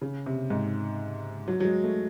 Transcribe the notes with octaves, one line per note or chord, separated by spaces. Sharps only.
C#3
C3
G#2
F#3
F#3
G#3
A3